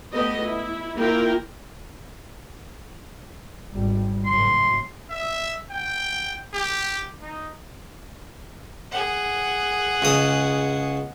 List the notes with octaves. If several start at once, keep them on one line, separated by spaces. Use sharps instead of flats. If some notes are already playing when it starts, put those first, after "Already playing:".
A3 B3 G4 D#5
E4
A#3 E4 F4 A#4 G5
G#1 G3
F#1 F#2 A2 C6
E5
G5
G4
D#4
G#4 F#5
C#2 C#3 D#6